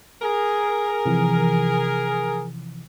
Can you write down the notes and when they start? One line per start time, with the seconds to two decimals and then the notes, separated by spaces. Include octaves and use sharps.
0.22 G#4 A#4
1.06 C3 E3 F3